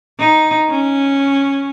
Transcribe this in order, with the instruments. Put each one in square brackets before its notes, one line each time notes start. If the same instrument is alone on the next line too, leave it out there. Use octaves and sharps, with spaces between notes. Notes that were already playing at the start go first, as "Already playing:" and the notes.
[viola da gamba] D#4
C#4